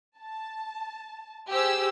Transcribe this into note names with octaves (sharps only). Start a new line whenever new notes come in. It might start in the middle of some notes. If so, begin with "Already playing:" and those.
A5
G4 G#4 C5 E6